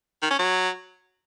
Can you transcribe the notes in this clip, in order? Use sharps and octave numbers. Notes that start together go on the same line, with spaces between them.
D#3
C#4
F#3